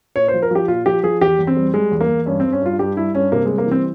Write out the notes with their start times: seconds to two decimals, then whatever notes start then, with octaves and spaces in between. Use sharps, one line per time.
0.16 A#2 C#5
0.28 C5
0.34 F3
0.42 A#4
0.51 F3 G4
0.68 A#2 F4
0.86 F3 G4
1.03 F3 G#4
1.21 E2 G4
1.39 E2
1.47 C4
1.57 G3
1.74 G3 G#3
1.91 E2
2.01 A#3
2.09 E2
2.26 G2 C#4
2.40 C4
2.45 G2
2.52 C#4
2.62 G2 F4
2.79 G2 G4
2.96 G3 E4
3.14 G2 C#4
3.32 C3 A#3
3.46 G3 G#3
3.58 A#3
3.67 E3 C4